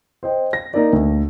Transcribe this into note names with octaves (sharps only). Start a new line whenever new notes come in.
C5 D#5 G5
A#6
A#3 D#4 A#4 D5
D2